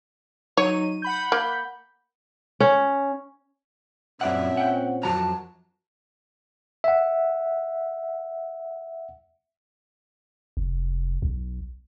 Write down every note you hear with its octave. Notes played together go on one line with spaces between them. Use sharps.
F#3 D#4 C#5 D#7
F#5 B5 G6
A#3
C#4
F#2 A#2 C4 C#4 D5 E5 F#5
F#5 G5
F2 F#3 A5 A#5
E5 F#5
F1
B1